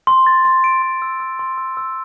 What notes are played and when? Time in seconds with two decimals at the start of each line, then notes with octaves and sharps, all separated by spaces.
0.07 C6
0.27 A6
0.45 C6
0.64 D7
0.82 C6
1.02 E6
1.20 E6
1.39 C6
1.58 E6
1.77 E6